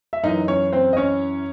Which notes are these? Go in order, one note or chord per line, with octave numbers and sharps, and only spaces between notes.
E5
F#2 E3 D#4 D#5
C#4 C#5
C4 C5
D#5
C#4 C#5